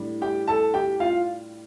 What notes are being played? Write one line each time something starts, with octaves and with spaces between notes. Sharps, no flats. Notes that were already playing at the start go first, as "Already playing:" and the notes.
Already playing: A2 G3 D4
G4 G5
A4 A5
G4 G5
F4 F5